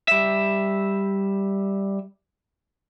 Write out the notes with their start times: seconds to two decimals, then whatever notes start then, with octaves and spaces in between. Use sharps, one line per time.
0.08 G3 E5